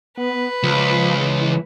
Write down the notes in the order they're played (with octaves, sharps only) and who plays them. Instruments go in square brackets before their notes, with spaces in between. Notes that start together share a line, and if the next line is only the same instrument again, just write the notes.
[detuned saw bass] B3 [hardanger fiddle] B4
[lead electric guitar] C#2 [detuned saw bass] F3
[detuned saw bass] E3